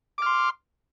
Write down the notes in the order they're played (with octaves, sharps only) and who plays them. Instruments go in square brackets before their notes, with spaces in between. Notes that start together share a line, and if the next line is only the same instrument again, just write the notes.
[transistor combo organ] D6
F6
C6